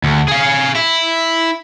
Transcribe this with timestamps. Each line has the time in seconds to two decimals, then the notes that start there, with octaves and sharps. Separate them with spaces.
0.04 D2
0.28 G#4 F5
0.75 E4